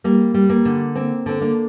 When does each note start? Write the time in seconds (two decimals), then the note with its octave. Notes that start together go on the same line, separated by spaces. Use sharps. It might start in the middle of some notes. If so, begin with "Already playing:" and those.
0.04 G3 A#3
0.34 G3
0.50 A#3
0.65 D3
0.95 A#3 C4
1.26 D3 C4
1.41 A#3 D4